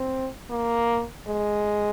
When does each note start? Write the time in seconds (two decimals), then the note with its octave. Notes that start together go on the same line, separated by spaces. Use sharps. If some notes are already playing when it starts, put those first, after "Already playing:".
Already playing: C4
0.50 A#3
1.28 G#3